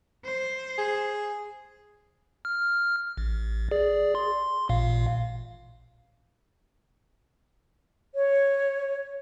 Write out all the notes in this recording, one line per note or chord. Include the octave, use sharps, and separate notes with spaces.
C5
G#4
F6
A1
G#4 D5
C6
A1 A#2 F5
C#5